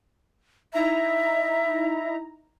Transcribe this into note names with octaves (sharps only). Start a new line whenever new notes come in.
D#4 E4 E5 A#5